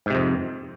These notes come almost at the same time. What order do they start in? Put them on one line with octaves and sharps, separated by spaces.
G#2 C3 F2